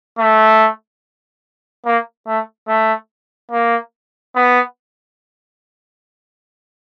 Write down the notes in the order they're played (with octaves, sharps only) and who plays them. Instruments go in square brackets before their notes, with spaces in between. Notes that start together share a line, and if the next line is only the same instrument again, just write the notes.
[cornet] A3
A#3
A3
A3
A#3
B3